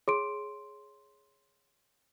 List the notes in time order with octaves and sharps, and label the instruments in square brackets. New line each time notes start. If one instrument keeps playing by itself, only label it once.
[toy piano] G#4 [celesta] C#5 C6 D7